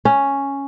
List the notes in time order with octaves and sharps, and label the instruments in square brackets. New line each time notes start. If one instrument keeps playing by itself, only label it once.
[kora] C#4